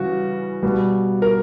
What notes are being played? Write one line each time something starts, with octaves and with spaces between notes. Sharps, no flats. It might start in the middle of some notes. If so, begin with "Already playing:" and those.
Already playing: C#3 E3 G3 F#4
B2 G3
A#4